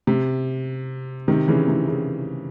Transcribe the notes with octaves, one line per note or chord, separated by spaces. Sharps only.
C3
C3 D#3
C#3 E3
C3
C#3